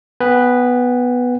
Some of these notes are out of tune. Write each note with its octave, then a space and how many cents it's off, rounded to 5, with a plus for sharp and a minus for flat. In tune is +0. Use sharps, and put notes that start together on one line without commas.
B3 +0 B4 +0 G5 +40